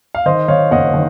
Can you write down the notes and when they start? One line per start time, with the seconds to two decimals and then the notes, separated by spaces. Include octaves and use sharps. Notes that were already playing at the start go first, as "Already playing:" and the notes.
0.15 F5
0.26 D#3 C5 D#5
0.48 D#3 C#5 F5
0.71 F#1 D#5 F#5
0.94 D#3